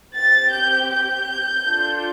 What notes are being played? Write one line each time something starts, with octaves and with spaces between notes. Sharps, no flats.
C4 G4 A6
G6
G6
D4 F4 A4